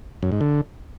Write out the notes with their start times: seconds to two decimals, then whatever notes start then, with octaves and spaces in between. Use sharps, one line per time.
0.23 F#2
0.32 G#2
0.41 D3